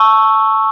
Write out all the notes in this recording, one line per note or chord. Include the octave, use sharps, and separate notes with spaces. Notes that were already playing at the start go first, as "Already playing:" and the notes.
Already playing: A5 C#6 E6